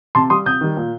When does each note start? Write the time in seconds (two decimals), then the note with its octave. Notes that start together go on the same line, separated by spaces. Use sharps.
0.15 C3 A5 C6
0.30 G3 C6 D#6
0.46 C3 D#6 G6
0.61 D#3 G3
0.77 A#2